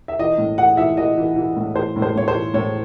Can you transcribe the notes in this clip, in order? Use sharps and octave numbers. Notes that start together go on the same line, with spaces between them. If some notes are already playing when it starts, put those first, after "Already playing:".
E5
E3 D#5
A2
E3 F#5
E3 E5
E3 D#5
E3
E3
A2
E3 C5
A2
C5
A2 C#5
C5
E3
A2 C#5